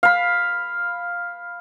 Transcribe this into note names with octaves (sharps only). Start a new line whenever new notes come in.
F5 B5